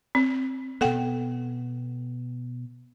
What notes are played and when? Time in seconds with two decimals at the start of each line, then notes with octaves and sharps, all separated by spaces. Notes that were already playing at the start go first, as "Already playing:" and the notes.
0.15 C4
0.81 B2 B3 A4 F#5 G5